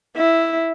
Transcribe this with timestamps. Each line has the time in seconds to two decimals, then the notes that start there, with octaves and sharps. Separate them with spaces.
0.16 E4